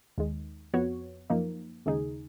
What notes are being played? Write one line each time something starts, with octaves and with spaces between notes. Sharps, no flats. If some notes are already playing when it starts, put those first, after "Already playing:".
D#2 D#3 G#3
F2 F3 B3 F#4 C#5
F#2 F3 A#3 D#4
D#2 C#3 G#3 D#4 G#4